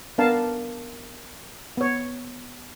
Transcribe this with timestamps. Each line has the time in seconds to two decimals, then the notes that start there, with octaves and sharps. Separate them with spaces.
0.18 B3 D4 A#4 F5 A5
1.77 B3 C#5